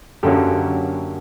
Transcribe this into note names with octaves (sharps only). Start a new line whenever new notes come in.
F#2 D3 F#3 A#3 C#4 G4 A4